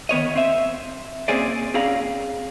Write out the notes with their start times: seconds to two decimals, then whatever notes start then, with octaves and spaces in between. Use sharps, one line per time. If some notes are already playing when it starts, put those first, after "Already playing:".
0.09 D#3 B3 C#5 D#5
0.36 C4 E5
1.28 A#3 C4 C#4 G#4 C5 D5
1.74 C4 C#4 G#4 D5 F5 A#5